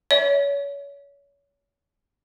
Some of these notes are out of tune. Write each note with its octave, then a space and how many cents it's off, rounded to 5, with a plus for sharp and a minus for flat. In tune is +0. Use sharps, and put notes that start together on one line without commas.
C#5 +30 E5 -30